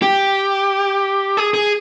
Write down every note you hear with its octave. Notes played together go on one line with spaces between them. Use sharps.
G4
G#4
G#4